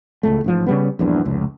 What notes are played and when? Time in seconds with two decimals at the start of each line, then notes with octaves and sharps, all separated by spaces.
0.23 C#2 A2 A3
0.44 A1 G#2 F3
0.66 C#3 G3 B3
0.99 A#1 E2 G2
1.25 F1 C#2